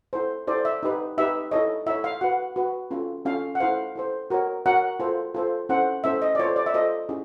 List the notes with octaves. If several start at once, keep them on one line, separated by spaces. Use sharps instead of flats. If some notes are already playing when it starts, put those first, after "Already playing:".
E4 A4 C5
E4 A4 C5 D5
E5
D#4 G4 B4
D#4 G4 B4 E5
E4 A4 C#5 D#5
E4 A4 C#5 E5
F5
F#4 B4 F#5
F#4 B4
C#4 F4 A4
C#4 F4 A4 F5
F#5
E4 A4 C5 F5
E4 A4 C5
F#4 A#4 C#5
F#4 A#4 C#5 F#5
F4 A4 C5
F4 A4 C5
C#4 E4 A4 C5 F#5
C#4 E4 A4 C5 E5
D#5
D5
F4 A4 C5 C#5
D5
E5
F4 A4 C5 D#5
C#4 E4 G#4